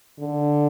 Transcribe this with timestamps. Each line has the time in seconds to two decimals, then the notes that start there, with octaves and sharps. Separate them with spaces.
0.19 D3